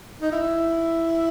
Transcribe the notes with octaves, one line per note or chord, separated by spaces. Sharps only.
D#4
E4